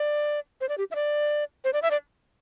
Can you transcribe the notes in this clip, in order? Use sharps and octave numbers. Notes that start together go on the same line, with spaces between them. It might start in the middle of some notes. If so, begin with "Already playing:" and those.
Already playing: D5
C5
D5
G4
E5
D5
C5
D5
E5
D5